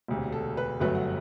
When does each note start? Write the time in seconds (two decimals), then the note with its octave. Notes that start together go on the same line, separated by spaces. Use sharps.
0.08 E1 D2 C3
0.32 A4
0.57 B4
0.80 G1 F#2 F#3 A3 B4
0.95 F#5